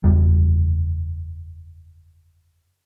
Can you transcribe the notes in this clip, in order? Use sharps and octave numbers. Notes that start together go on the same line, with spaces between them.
F#1 E2 G3